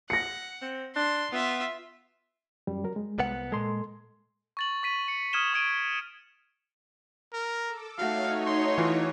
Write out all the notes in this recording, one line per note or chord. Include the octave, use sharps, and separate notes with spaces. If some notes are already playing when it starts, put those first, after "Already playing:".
F#5 A#6 C#7
C4
D4 C6
B3 F4 E5
F#2 G3
F#3 A#4
G#3
C2 B3 F#5
A#2 G#3 A4 C6
C#6 A6 F#7
C#6 B6 D#7
C#7
D#6 F6 G#6 D#7 E7 G7
C#6 G#6 D7 D#7
A#4
A4 D6 E6
A3 D#4 F#4 C#5 F5
C6
E3 F4